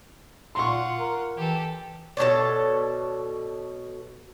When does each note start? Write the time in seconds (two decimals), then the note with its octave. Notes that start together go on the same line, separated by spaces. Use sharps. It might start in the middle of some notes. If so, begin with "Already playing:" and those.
0.55 A#2 F4 F#5 C6 C#6
0.99 A#4
1.37 E3 G4 A4
2.17 B2 A4 C#5 D5